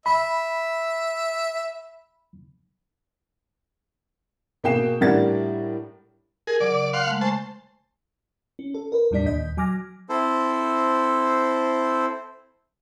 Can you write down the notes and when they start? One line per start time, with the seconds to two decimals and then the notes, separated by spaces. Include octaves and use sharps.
0.06 E5 B5
4.64 B2 A#3 G#4 G5 C7 E7
5.01 A2 G3 D4 A#4 F#5 A6
6.47 G#4 A#4
6.60 C#3 F#3 D5
6.73 D6
6.93 F5 F#5 C6
7.07 G#3 A3
7.21 C5 G#5 A5 C#6
8.59 C#4
8.74 A4
8.92 A#4 B4
9.11 E2 A2 G3 D4 D5 B6
9.26 D#2 A#2 D#5 G6 B6
9.57 F#3 G#5 D6 F6 A#6
10.09 C4 E4 A4 C5